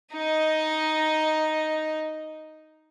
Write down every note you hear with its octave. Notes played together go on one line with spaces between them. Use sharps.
D#4 D#5